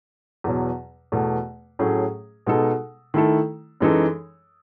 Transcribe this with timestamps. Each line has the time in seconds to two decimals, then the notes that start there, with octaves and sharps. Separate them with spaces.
0.44 E2 B2 F#3
1.12 E2 B2 A3
1.79 A2 F#3 A3 C#4 G#4
2.47 B2 G#3 D#4 A4
3.14 D#3 A3 E4 A4
3.80 F#2 E3 G#3 D#4 A4